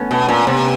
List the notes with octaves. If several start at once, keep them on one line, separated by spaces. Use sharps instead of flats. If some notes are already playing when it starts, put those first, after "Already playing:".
Already playing: A3 B3 C#4
B2
A#2
C3 B3 C#4